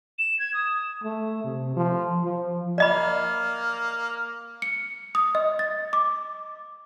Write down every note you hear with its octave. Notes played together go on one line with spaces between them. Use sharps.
E7
G#6
D#6
A3
C3
F3
F3
A#3 D5 D#5 B5
C#7
D#6
D#5
A6
D6